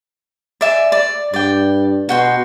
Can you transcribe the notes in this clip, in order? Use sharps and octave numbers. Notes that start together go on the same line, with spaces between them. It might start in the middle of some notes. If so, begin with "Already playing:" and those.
D5 E5 G#5
D5
G2 D5 G5
B2 F#4 G5 C6